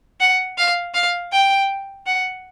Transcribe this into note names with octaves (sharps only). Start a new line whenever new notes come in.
F#5
F5
F5
G5
F#5